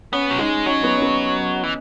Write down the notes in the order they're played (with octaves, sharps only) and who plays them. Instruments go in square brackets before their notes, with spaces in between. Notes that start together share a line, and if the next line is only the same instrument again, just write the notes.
[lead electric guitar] B3 [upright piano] C#4
[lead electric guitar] F#3
[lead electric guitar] G#3 [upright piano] D#4
[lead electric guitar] F#3 [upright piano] C#4
[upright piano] B3
C#4
B3
[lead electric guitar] E3